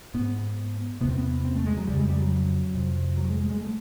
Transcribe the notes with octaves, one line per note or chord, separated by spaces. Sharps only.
G#2 B3
E2 C3 B3
C4
B3
C4
A3
G#3
F#3
F2 C#3 G3
G#3
G3
F#3
F2 C3
F#3
G#3
G#3
G#3
A3